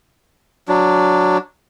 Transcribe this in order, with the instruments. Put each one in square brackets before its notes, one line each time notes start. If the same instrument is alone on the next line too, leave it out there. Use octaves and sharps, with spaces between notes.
[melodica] F#3 D4